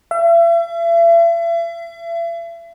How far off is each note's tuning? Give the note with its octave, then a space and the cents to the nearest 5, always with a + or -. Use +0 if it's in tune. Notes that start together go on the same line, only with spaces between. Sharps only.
E5 +40